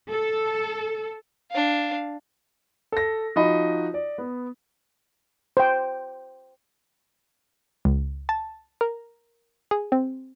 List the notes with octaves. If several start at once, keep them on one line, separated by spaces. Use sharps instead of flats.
A4
D4 F5
A4 A#6
F3 D#4 F#4 D#5 B5
D5
B3
C5 G5
C#2
A5
A#4
G#4
C4